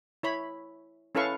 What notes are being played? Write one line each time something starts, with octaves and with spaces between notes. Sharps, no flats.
E4 C#5 B5
C#4 E4 A4 B4 F5 C#6